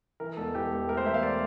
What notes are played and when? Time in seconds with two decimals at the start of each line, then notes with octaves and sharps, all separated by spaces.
0.20 E3 A#4
0.37 E1 A4
0.55 E3 G4
0.72 E1
0.88 A3 A#4
0.97 C5
1.06 E1 E5
1.14 F5
1.23 A3 D5